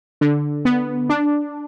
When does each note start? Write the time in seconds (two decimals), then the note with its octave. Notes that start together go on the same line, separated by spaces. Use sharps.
0.21 D3
0.65 B3
1.09 D4